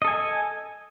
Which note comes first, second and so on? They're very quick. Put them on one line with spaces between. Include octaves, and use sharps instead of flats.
D#5 A4 G#5